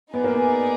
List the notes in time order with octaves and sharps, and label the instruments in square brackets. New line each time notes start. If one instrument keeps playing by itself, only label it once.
[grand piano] B3 [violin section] D#4 G#4 D5
[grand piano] A#3
B3